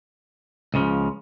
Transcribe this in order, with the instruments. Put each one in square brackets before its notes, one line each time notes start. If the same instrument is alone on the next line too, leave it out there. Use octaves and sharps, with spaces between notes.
[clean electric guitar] C#2 C#3 F3